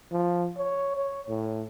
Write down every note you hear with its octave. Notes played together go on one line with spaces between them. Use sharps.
F3
C#5
C#5
A2